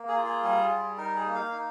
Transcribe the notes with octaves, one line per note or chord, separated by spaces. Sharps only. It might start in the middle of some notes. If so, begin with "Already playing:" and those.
Already playing: A#3
G#4
F4
G#4
G3 G#4
G3
D#4 A#4
G#4
A#3
F5
D#4